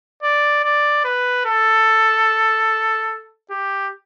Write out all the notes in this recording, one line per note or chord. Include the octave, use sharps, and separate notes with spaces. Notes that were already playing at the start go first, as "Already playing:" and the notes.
D5
D5
B4
A4
G4